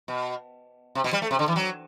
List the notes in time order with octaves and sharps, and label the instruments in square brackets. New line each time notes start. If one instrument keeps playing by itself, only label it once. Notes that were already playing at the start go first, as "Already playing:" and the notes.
[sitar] B2
C3
B2
G3
A3
C3
D3
E3
F#3